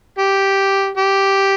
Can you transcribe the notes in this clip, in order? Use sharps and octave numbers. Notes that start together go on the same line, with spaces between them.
G4
G4